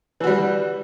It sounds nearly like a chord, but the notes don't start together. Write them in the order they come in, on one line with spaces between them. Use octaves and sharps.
E3 F#4 G3